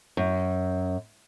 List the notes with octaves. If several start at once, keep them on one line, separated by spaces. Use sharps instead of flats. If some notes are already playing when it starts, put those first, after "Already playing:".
F#2